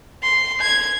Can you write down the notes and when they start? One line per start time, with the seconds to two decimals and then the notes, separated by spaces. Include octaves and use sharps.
0.22 C6
0.61 G#6